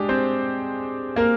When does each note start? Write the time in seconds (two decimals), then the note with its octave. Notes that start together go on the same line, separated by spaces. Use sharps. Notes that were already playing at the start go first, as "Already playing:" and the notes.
Already playing: G#3 D4 G4 G#4 D5
0.09 C4 C5
1.16 A#3 A#4